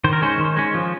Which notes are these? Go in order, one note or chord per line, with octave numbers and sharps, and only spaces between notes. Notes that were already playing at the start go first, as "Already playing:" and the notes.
D#3 C5
A#4
G#3 C#4 C5
D#3
G#3 C#4
F3